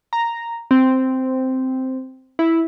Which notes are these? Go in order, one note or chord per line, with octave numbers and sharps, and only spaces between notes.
A#5
C4
E4